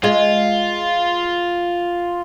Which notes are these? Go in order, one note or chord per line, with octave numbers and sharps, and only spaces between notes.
G#3 F4